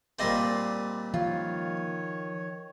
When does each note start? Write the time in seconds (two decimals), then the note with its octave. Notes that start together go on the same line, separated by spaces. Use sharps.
0.19 A#2 G3 C4 D5 D#5 C6
1.14 D#3 F3 F4 C#5